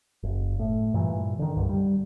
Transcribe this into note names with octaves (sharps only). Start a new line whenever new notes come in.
F#1
A2
G2 A#2 E3
D3 D#3
C2 G2 D3
G3